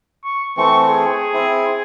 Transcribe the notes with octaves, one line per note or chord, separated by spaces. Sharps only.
C#6
E3 A3 C4 C#6
G#4
C4 E4